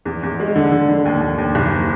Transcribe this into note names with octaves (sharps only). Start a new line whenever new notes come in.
E2
E2
G#3
D3
D3
D3
D#2
D#2
D#2
F#1